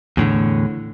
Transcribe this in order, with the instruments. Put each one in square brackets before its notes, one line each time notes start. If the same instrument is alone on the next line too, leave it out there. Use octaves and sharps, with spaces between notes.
[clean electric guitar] E2 A2 D3